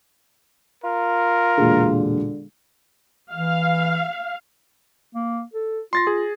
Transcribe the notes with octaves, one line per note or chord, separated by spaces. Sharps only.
F4 A#4
E1 A#2 D3 G#4
E3 F5
A#3
A4
F4 C6 A6 A#6
G#4